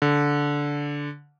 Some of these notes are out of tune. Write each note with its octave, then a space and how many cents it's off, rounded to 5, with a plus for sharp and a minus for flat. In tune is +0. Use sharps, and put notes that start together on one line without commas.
D3 -15